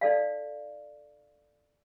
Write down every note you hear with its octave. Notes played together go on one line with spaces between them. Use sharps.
D#4 A4 D5 F5